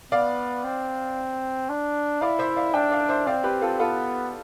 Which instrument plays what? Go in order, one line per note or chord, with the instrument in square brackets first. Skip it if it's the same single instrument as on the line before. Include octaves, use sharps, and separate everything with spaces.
[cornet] B3 [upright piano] D5 F5
[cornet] C4
D4
[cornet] E4 [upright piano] D5 F5
[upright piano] C5 E5
D5 F5
[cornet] D4 [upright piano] E5 G5
[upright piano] D5 F5
C5 E5
[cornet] C4 [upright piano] D5 F5
[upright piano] G4 B4
F4 A4
[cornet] B3 [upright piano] F4 A4